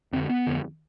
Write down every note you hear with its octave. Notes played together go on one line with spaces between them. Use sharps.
F2 D3 C4
B3
F2 D3